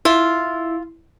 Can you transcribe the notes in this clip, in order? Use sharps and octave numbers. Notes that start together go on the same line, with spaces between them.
E4 F4